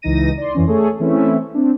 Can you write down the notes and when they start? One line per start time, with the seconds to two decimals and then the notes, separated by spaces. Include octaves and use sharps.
0.02 C#2 E3 D#4 A#6 D#7
0.37 D5 C6
0.54 F2 E3 C#4
0.67 A3 G#4 A4 C#5
1.00 E3 A3 C4 C#4 E4
1.54 C4 D4